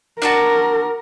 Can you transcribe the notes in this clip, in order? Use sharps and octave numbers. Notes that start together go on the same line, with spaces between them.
D4 F#4 A#4 A5